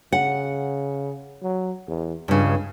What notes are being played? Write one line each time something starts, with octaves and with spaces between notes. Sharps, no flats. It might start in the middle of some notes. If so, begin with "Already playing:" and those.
C#3 F#5
F#3
E2
C#2 G2 C#3